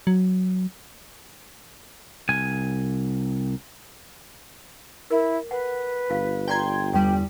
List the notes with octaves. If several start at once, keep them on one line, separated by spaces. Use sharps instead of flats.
F#3
C2 G#5
E4 A#4
B4 F#5
G1 F4 F5
F4 D5 G5 A#5 C6 G#6
E2 G3 G5